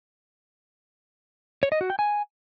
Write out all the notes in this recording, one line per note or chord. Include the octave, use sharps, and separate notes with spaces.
C#5
D#5
F#4
G5
G#5